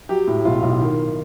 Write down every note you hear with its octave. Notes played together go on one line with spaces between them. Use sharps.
F#3 G4
A2
B1 F4
B1
D#3